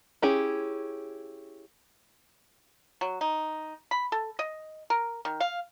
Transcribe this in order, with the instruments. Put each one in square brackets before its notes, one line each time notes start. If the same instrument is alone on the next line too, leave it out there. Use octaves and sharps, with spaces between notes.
[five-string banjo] C#4 E4 G4 G#4
[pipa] F#3
D#4
B5
A4
D#5
A#4
D#3
F5